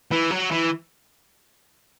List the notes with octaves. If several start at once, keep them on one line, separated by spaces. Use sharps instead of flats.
E3
F#3
E3